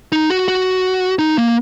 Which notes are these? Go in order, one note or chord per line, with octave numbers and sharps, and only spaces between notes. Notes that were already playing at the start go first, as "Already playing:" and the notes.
D#4
F#4
F#4
D#4
A#3